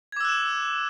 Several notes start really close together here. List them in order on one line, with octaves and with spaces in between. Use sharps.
G#6 D6 E6 F#6 E7